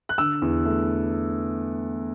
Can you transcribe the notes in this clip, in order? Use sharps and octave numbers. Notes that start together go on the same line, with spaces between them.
F#6
D3 E6
E2
A3